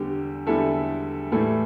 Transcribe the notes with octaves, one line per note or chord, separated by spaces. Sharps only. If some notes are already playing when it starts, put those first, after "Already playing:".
Already playing: E2 D3 G3 G4
E2 D3 G3 E4 A4
A2 E3 G3 E4 A4